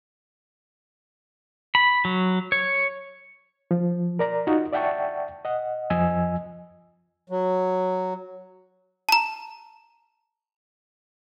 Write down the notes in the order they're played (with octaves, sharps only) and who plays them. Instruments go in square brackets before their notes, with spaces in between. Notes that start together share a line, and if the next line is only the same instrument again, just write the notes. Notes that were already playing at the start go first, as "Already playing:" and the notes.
[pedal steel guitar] B5
F#3
C#5
[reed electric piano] F3
A#4 D5 A#5
D#4 F4 F#4
D5 E5 F#5 G5 A5 C#6
D#5 F#5
F2 F3 D#5 G#5 E6
[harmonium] F#3
[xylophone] A5 A#5